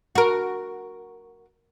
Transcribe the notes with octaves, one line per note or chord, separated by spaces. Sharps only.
F#4 A#4